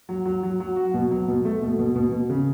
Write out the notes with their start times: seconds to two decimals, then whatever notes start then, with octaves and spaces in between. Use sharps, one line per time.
0.09 F#3
0.26 F#3
0.43 F#3
0.60 F#3
0.76 F#4
0.94 B2
1.11 F#3
1.28 B2
1.45 A3
1.62 B2
1.79 B2
1.95 B2
2.12 B2
2.30 C#3